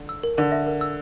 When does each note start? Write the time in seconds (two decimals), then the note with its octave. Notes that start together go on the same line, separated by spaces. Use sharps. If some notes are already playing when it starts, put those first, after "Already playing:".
Already playing: D3
0.09 E6
0.23 A#4
0.37 D3 A#4
0.52 E5
0.66 A#4
0.81 E6